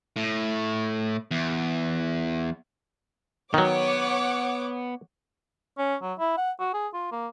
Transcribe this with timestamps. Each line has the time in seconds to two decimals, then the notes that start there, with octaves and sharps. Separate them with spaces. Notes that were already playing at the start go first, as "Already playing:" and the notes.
0.16 A2
1.31 E2
3.54 D#3 F#3 B3 C#5 F#5 D6
5.78 C#4
6.02 F#3
6.19 E4
6.37 F#5
6.59 F#4
6.74 G#4
6.94 F4
7.12 A#3